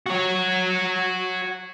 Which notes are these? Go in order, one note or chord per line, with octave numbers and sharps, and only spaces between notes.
F#4 C#5